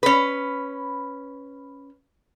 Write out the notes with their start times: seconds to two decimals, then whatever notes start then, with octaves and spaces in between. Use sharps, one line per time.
0.03 C#4 B4